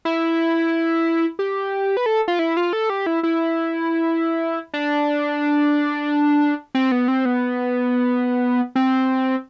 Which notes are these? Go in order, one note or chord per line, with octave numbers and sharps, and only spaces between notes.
E4
G4
B4
A4
F4
E4
F4
A4
G4
E4
E4
D4
C4
B3
C4
B3
C4